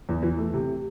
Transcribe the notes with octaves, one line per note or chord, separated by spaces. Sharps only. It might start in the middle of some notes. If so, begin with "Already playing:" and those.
E2
E3
A3
C3